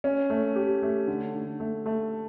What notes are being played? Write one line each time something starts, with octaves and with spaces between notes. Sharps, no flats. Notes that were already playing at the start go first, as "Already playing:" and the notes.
C#4
A3
G4
A3
D3
D3
A3
A3